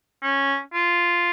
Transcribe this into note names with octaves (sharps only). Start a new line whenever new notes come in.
C#4
F4